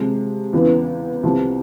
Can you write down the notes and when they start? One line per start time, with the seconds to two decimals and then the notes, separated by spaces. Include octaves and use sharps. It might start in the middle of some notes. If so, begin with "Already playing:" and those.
Already playing: C3 F3 G#3
0.53 E2 C#3 E3
1.23 C2 C3 F3